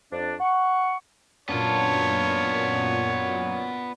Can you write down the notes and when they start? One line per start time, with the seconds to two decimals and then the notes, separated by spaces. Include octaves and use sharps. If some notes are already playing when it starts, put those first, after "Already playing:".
0.12 F2 D4
0.40 F#5 C#6
1.49 F#2 A#2 B3 D4 F4 C#5